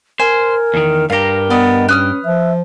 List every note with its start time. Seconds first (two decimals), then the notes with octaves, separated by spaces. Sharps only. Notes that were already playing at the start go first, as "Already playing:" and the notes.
0.19 A#4 C5 G#5
0.74 E2 D#3
1.10 G2 G4 A#4 F5 A#5
1.50 B3 D5 D#5
1.89 C#4 B4 D#6 F6
2.25 F3 E5